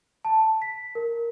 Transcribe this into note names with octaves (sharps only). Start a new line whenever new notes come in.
A5
B6
A#4